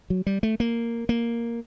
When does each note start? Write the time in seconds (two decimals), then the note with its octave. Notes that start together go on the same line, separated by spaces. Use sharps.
0.10 F#3
0.27 G3
0.43 A3
0.60 A#3
1.09 A#3